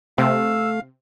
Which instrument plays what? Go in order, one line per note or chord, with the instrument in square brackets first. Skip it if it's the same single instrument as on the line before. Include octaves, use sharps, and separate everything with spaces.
[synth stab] C3 [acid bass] A3 [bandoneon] F5 [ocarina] E6